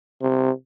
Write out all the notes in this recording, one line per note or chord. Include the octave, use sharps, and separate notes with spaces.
C3